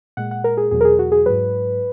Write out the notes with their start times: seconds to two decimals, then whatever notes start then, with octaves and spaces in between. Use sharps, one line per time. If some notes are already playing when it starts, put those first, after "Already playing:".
0.17 A#2 G#3 F#5
0.31 F#5
0.44 A#4
0.57 G#4
0.71 E2 B2 F#3 G#4
0.81 A#4
0.85 G#4
0.99 F#4
1.12 G#4
1.26 G#2 F#3 B4